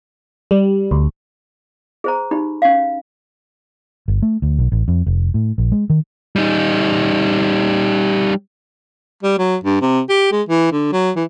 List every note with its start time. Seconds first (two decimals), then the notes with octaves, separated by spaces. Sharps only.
0.51 G3
0.91 D2
2.04 G#4 C5 A#5
2.31 D#4 G4 B5
2.62 C#4 F5
4.08 G1
4.22 A3
4.42 D2
4.59 B1
4.72 A1
4.88 F2
5.06 F1
5.34 A2
5.58 A#1
5.72 G#3
5.90 D#3
6.36 G3 D#4
9.23 G3
9.38 F#3
9.64 G2
9.81 C3
10.09 G4
10.32 G#3
10.49 E3
10.72 D3
10.92 F#3
11.16 E3